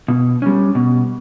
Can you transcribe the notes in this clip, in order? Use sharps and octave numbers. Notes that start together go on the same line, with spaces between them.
B2
G3 C#4
B2